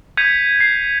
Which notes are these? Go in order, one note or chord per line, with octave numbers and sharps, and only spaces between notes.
G6 G#6 B6 C#7 D#7 F7
C7